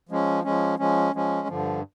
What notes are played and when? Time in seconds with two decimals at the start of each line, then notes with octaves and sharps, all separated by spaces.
0.09 F3 G#3 C#4
0.44 F3 G#3 C#4
0.79 F3 G#3 C#4
1.14 F3 G#3 C#4
1.48 G2 D3 F3